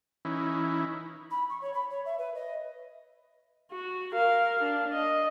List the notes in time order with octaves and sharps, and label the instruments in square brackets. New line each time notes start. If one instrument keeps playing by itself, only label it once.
[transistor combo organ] E3 C#4 D#4 E4
[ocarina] B5
C#6
C#5
B5
C#5
E5
B4
D#5
[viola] F#4
A#4 F5
D4
D#5